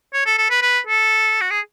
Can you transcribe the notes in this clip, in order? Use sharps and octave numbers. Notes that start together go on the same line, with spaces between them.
C#5
A4
A4
B4
B4
A4
F#4
G#4